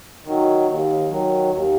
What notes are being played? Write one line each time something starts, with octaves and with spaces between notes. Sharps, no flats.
D#3 F#3
D#2
D#3 F#3
D#2